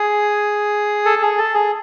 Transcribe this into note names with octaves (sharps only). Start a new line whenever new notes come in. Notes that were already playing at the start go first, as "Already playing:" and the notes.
Already playing: G#4
A4
G#4
A4
G#4